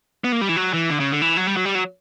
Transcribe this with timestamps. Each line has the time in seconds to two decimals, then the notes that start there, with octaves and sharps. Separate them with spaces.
0.24 B3
0.32 A#3
0.41 G3
0.49 E3
0.56 F#3
0.74 E3
0.90 D3
1.00 C#3
1.11 D3
1.22 E3
1.37 F#3
1.47 G3
1.57 F#3
1.65 G3
1.75 F#3